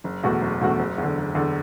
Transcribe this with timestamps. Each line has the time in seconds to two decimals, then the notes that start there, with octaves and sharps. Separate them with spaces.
0.04 F#1
0.23 E2 B2 A3 F#4
0.42 F#1
0.61 E2 B2 A3 F#4
0.79 F#1
0.98 E2 D3
1.17 F#1
1.35 E2 D3